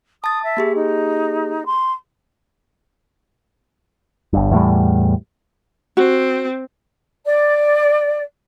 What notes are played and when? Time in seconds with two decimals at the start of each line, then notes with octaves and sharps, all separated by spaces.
0.24 A5 D#6 A6
0.44 E5
0.57 A#3 G4 G#4
0.75 D#4
1.66 C6
4.33 G1 G2
4.51 E2 A2 G3
5.97 C4 F#4
7.25 D5